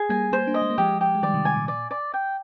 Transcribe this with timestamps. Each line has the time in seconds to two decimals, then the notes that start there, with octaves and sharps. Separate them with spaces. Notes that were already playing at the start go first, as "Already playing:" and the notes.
Already playing: G#4
0.09 G3 A#3 G#5
0.32 G3 A#3 C5
0.47 A#3 D4
0.54 D#5
0.62 G#3
0.70 A#3
0.78 F3 G#3 G4
1.01 G4
1.15 G#3
1.22 D#3 G3 D5
1.34 C3 D#3
1.45 C3 G#5
1.56 A#2
1.68 D5
1.91 D5
2.14 G5